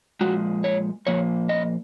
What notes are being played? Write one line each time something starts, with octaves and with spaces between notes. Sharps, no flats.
A#2 F3 G#3 F#4
C#5
A#2 F3 A#3 C#5
D#5